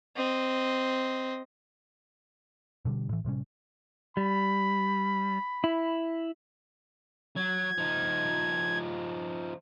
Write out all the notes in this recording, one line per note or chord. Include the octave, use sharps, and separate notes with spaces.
C4 D#5
B2 D3 G3
A2 E3
A2 C3 G3 C#4
G3 B5
E4
F#3 G#6
F3 D#4